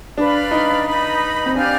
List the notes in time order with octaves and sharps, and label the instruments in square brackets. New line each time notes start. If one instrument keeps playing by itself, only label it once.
[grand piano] D4 [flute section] B4 D5 F5 B5
[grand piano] D#4
[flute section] D#4 B4 D#5 B5
[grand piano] C4
[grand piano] D4 [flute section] G4 D5 F5 G#5